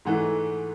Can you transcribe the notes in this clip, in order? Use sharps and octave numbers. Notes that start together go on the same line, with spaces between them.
G#2 E3 A3 F#5